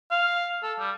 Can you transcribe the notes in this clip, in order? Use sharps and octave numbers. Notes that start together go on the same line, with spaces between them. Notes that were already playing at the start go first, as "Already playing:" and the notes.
F5
A4
G3